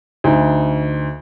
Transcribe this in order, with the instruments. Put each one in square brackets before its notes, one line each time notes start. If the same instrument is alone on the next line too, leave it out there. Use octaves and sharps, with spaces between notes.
[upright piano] D2 D#4